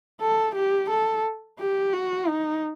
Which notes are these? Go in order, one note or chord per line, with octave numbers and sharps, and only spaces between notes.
A4
G4
A4
G4
F#4
D#4